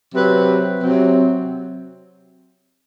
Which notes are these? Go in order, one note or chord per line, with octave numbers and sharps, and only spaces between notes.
C3 F#3 C4 B4
C3 F#3 C4